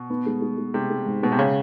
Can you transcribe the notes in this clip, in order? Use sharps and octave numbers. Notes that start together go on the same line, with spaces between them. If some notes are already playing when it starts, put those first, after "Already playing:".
Already playing: B2
B3
G#3
G#3
G#3
C3 G#3
G#3
G#2
B2 G#3
C3
C#3